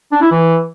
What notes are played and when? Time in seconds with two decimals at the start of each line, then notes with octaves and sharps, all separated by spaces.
0.12 D4
0.22 E4
0.31 E3